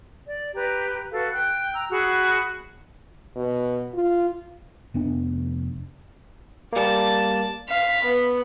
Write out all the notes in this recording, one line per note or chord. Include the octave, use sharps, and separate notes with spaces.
D5
G4 B4 A#5
F#4 A4 B4 F5
G5 F#6
G5 A#5 E6
F#4 G#4 B5 F#6
B2
F4
F1 B3 D4
G3 A#3 D5 A5
F5 B6
B3